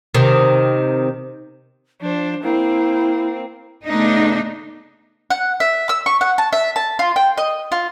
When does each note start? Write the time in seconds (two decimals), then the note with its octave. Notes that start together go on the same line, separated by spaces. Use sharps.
0.14 C3 D#3
2.01 F3 D4 C5
2.43 A#3 C4 E4
3.85 C#3 A3 B3 D4 D#4
5.30 F#5
5.60 E5
5.89 E6
6.06 C#6
6.21 F#5
6.38 A5
6.53 E5
6.76 A5
6.99 F4
7.16 G5
7.38 D#5
7.72 F4